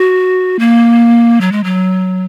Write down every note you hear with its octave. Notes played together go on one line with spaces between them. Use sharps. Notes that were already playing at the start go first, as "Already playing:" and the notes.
Already playing: F#4
A#3
F#3
G#3
F#3